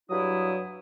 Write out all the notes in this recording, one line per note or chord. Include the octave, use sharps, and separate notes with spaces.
G2 F#3 E4 D#6